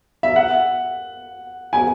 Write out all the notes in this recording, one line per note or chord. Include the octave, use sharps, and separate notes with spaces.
E5
F#5
G#5